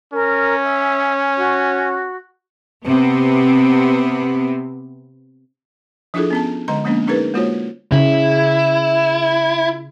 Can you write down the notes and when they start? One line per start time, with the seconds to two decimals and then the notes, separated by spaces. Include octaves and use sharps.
0.13 C#4 A#4
0.64 E5
1.37 F#4
2.85 C3 B3 C4
6.14 F3 D4 E4 F4 G#4 A4
6.30 B3 C#4 A5
6.68 D3 G#3 D#5 A#5
6.85 F3 G#3 A#3 B3 C#4 D4
7.07 C#4 D#4 G#4 A#4 B4
7.34 G#3 A#3 F4 F#4 C5 C#5
7.92 C#3 E4